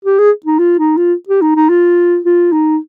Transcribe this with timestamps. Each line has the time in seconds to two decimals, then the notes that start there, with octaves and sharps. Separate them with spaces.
0.05 G4
0.18 G#4
0.46 D#4
0.59 F4
0.79 D#4
0.97 F4
1.29 G4
1.42 D#4
1.55 D#4
1.70 F4
2.25 F4
2.52 D#4